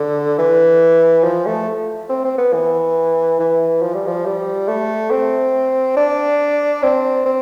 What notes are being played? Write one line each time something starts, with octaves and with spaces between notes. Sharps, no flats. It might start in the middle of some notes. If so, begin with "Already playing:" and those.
Already playing: D3
E3
F3
A3
C4
C4
B3
E3
E3
F3
G3
F3
G3
A3
C4
D4
C4
C4